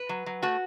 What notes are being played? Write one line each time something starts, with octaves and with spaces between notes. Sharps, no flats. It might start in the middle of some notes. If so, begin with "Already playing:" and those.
Already playing: B4
F#3
F#3
A3 F#4